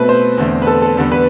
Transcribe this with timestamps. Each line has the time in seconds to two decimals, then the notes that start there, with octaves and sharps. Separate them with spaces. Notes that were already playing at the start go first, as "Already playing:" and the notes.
Already playing: B2 A3 C4 B4
0.09 C5
0.38 E2 D3 A3 C4
0.62 B4
0.67 A4
0.82 A4
0.97 E2 D3 G3 B3 A4
1.12 B4